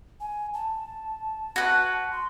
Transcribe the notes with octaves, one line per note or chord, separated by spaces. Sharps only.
G#5
A5
F#4 B4
C6